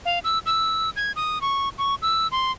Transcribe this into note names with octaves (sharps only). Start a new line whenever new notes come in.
F5
E6
E6
G#6
D#6
C#6
C#6
E6
C6